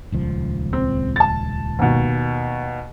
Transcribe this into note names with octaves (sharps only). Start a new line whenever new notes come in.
D#1 C#2 F3
C4
A5 A6
D#2 B2